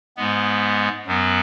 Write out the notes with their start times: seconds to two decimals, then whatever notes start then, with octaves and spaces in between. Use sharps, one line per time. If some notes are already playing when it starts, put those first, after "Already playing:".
0.17 G#2 G#3 B3
1.06 F#2 F#3 B3